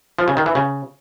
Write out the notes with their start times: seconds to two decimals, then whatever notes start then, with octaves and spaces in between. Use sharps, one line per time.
0.19 F3
0.28 C#3
0.37 D#3
0.46 E3
0.55 C#3